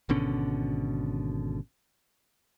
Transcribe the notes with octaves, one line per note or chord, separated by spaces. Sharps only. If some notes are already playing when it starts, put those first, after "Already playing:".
G#1 B2 D3 C#4